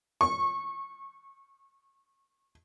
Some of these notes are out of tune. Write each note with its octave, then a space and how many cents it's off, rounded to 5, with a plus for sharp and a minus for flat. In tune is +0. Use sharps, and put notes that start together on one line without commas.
C#6 -25